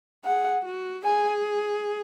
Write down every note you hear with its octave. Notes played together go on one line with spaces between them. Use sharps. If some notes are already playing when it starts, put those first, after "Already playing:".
G#4 F#5
F#4
G#4 G#5